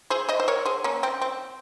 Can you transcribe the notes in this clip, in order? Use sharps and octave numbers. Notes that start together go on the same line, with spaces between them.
G#4 C5
C5 D#5
C5
A#4 C#5
G#4 C5
A#3 C#4
C4
C4